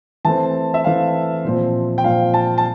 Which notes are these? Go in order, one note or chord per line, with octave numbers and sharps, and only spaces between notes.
E3 A3 C4 A5
E5
E3 A3 C4 F5
A#2 F3 C4
G5
A#2 F3 C4 F5
A5
A5